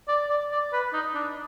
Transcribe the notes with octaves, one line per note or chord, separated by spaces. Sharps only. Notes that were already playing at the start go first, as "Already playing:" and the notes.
D5
D5
D5
B4
D#4
D4